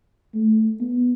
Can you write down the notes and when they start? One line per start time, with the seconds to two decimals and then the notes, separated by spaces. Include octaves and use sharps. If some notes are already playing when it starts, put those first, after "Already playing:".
0.35 A3
0.81 B3